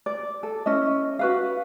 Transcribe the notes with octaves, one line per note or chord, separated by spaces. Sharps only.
D5
A4
C#4 E4 D#5
F#4 B4 F5